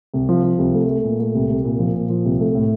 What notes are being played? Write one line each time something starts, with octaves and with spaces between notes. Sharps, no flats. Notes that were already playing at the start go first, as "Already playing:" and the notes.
C2
F3
F3
C2
A3
A3
A#2
A3
C2
C2
A#2
F3
A#2
F3
C2
A3
A2